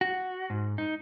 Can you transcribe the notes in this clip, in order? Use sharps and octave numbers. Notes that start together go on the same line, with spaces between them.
F#4
G#2
D#4